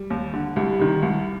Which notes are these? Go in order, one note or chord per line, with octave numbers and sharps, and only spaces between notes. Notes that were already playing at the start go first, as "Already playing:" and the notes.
Already playing: G3
D#2
D3
C2 G3
C3 D#3
C2